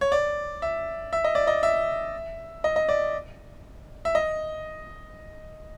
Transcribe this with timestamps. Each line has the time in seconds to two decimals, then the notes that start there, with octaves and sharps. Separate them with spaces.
0.01 C#5
0.12 D5
0.62 E5
1.13 E5
1.24 D#5
1.35 D5
1.47 D#5
1.63 E5
2.64 D#5
2.76 D#5
2.89 D5
4.05 E5
4.15 D#5